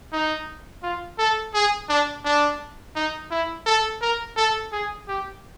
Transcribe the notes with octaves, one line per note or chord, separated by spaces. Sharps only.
D#4
F4
A4
G#4
D4
D4
D#4
E4
A4
A#4
A4
G#4
G4